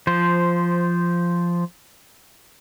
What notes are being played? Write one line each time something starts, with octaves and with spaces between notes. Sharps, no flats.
F3 C5